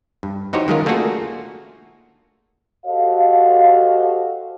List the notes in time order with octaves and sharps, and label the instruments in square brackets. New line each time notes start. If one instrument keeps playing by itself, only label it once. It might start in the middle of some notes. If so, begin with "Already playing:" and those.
[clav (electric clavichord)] G2
E3 D#4 F#4 G4 C5 C#5
D#3 F#3 G#3 C#4 F4 A#4
A3 A#3 D4 F4 F#4 G#4
[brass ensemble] F#4 G4 A4 C5 D#5 F5